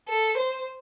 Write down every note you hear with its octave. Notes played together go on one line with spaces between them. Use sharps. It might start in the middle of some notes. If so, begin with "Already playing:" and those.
A4
C5